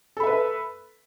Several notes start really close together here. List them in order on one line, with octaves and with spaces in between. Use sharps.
A4 B5 E5 B4